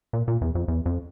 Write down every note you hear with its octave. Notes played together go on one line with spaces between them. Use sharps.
A#2
A#2
E2
F2
E2
F2